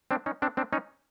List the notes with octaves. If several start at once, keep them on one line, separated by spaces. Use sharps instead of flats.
C4 D4
C#4 D#4
C4 D4
C4 D4
C#4 D#4